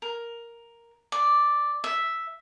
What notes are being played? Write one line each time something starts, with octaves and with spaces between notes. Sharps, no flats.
A#4
D5
E5